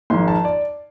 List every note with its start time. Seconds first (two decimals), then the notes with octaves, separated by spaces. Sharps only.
0.10 G#1 G#2 F3 C6
0.28 A5
0.45 D5